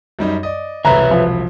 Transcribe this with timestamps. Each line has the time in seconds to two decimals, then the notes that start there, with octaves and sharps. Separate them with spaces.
0.19 F#2 G3 D#4
0.43 D5 D#5
0.85 E1 C2 B4 C#5 E5 A#5 B5
1.11 F3